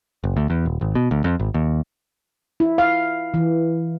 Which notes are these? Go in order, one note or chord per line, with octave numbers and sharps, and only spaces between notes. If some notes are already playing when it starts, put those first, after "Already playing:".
F#1
D2
E2
D#1
G#1
B2
D2
F2
G#1
D#2
E4
F5
E3